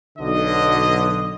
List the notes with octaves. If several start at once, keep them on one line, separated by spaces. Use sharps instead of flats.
B1 D3 D#5